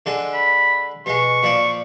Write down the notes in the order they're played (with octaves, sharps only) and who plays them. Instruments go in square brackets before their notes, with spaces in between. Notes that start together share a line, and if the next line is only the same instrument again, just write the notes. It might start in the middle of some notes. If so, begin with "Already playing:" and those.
[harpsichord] D3 G#3 A4
[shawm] B5
[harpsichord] B2 G#3 [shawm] C#6
[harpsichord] A#2 F3 D5